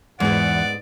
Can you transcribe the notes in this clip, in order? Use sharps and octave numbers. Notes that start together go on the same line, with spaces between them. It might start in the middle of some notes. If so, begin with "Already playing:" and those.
E2 G#2 B3 G#4 D5 F#5